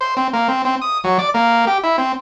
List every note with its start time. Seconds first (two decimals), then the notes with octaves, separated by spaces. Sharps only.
0.01 C5
0.17 C4
0.33 A#3
0.48 C4
0.65 C4
0.82 D#6
1.04 F#3
1.19 D5
1.34 A#3
1.67 G4
1.83 E4
1.98 C4